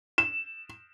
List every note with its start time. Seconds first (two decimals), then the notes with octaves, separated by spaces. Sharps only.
0.18 E7